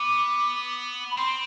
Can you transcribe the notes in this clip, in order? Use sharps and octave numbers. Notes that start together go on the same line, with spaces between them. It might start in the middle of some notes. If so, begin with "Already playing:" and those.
Already playing: B3 D6
B5
C4 C6